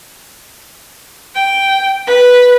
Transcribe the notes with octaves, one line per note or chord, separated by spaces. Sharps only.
G5
B4